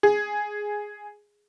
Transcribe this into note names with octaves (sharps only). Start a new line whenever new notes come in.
G#4